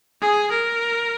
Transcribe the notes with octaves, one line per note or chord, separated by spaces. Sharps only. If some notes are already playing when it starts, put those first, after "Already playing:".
G#4
A#4